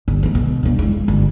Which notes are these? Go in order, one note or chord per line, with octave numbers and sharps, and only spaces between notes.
G1
D#3 G#3
B2
F1 G2
G#3 E4
G1